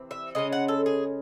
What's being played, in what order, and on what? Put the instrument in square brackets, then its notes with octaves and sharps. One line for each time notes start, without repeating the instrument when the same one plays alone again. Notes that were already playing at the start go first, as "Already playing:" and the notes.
Already playing: [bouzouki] C3 E3 C4
E5
C#3 G#3 C#4 D#5
F#5
A4
G#4